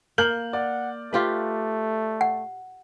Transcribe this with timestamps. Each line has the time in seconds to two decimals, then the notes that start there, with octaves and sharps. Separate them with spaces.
0.18 A#3 F6 G6 F#7
0.53 D5 F#5
1.13 A3 F4 G4 B4
2.21 F#5